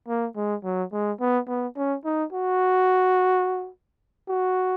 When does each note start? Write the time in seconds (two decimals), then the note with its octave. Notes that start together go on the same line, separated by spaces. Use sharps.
0.08 A#3
0.36 G#3
0.64 F#3
0.93 G#3
1.20 B3
1.48 B3
1.76 C#4
2.05 D#4
2.33 F#4
4.28 F#4